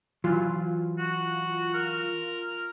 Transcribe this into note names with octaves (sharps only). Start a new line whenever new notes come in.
E3 F#3 F4
F#4
A#4